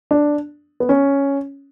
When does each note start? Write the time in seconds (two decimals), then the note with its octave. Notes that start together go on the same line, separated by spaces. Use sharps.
0.11 D4
0.80 B3
0.89 C#4